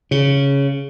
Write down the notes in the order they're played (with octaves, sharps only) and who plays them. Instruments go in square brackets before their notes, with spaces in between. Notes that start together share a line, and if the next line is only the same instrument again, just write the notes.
[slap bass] C#3